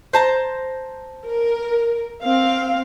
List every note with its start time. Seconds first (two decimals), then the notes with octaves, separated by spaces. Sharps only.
0.13 C5 A5 A#5
1.26 A#4
2.22 C4 F5